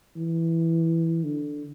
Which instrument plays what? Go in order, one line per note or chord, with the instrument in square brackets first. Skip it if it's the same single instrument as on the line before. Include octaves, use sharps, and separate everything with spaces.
[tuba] E3
D3